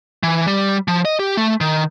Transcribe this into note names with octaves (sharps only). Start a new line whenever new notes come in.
E3
G3
F3
D#5
G4
A3
D#3